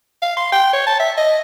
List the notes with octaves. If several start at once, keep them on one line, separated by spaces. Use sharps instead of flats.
F5
C6
G5
C#5
A5
E5
D#5